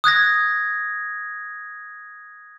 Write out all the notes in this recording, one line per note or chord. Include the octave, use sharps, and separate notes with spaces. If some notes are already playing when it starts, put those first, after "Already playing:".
D#6 F#6 G#6 A#6